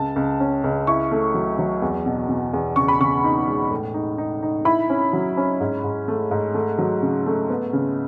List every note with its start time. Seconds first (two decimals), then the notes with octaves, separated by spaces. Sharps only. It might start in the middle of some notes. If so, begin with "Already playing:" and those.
Already playing: C#2 A5
0.16 C#2
0.40 C#4
0.64 C#2
0.87 E4 C#6
1.12 A3
1.34 F#3
1.59 F#3
1.82 E2
2.06 B2
2.29 B2
2.53 E2
2.76 C#3 C#6
2.88 B5
3.00 C#3 C#6
3.24 D#4
3.48 G#3
3.71 A2
3.94 D#4
4.18 D#4
4.43 D#4
4.65 E4 B5
4.90 C#4
5.13 F#3
5.37 C#4
5.60 G#2
5.84 G#2
6.08 A3
6.31 G#2
6.54 A3
6.79 F#3
7.02 C#3
7.26 A3
7.50 B3
7.73 C#3